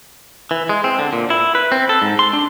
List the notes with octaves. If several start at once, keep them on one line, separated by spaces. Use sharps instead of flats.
E3
G#3
C4
D3
A#2
E4
B4
C4
A4
G#2
C6
D4